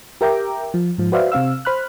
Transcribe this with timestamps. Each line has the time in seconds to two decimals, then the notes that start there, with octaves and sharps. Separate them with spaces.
0.21 G4 A#4 E5 G5 A#5 D6
0.74 F3
0.98 G#2 F3
1.12 F#4 B4 C5 D5 E5 F5
1.32 C3 C4 F5 E6
1.65 C5 B5 F6 F#6